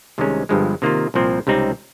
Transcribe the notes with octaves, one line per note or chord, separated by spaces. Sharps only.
C2 C3 D#3 G#3 C#4
G1 G2 F3 G#3
C3 D#3 A#3 F4
C2 A#2 F3 C4
C#2 C3 G3 C4 D#4